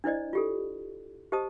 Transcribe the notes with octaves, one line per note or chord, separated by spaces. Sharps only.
D4 E4 C5 D5 D#5
F4 G4 A4
G4 C5 D#5 A5 D#6